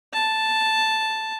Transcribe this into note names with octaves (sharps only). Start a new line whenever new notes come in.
A5